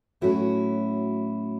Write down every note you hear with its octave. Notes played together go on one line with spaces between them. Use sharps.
A2 F#3 A3 C#4 E4 F#4